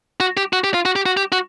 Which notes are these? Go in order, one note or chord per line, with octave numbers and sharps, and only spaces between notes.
F#4
G4
F#4
G4
F4
F#4
G4
F#4
G4
F#4